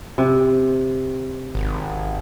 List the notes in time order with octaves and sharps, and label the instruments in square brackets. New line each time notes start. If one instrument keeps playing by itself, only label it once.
[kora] C3
[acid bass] G#1